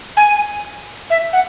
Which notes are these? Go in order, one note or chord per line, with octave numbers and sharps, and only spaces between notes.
G#5
E5
F#5